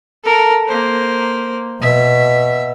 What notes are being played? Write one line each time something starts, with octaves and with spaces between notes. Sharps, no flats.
A4 A#4
A#3 C5
B2 E5